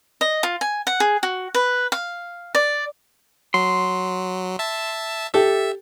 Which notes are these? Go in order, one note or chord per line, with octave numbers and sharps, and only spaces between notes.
D#5
F4
G#5
F#5
G#4
F#4
B4
F5
D5
F#3 C6
E5 A5
G4 A4 E5